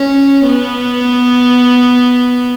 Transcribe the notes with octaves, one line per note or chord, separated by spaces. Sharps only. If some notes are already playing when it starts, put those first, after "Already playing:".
Already playing: C#4
B3